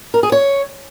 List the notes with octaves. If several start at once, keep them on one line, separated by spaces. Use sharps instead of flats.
A#4
G#4
C#5